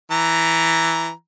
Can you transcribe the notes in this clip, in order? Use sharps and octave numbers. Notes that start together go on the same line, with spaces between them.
E3 A#5